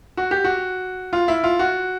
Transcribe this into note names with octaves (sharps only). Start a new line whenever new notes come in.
F#4
G4
F#4
F4
E4
F4
F#4